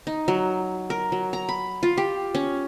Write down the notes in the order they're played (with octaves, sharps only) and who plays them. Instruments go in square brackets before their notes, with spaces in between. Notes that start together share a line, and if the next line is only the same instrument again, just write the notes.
[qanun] D#4
F#3
A#4
F#3
A#5
B5
F4
G4
C#4